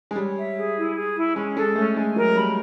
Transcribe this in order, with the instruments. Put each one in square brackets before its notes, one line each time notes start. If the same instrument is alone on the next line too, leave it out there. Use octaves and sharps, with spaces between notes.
[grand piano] G#3
[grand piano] G3 [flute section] C#5
[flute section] E5
G#4
E4
G#4
E4
[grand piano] G#3 [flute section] C#4
[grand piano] G#3 [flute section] A4
[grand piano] A3 [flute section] C#4
[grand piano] G#3 [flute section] G#5
[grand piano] F#3 [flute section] A#4
[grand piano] G3 [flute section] B5